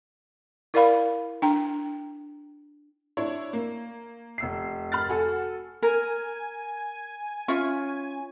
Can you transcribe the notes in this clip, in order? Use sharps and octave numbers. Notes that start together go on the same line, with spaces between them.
E4 A#4 D5 F5 B5
D4 G5 A#5
D4 E4 C#5
A#3
F1 E6 C7
B5 F6 A6
F#4 A4 G#5
A#4 G#5
C#4 F4 E5 C#6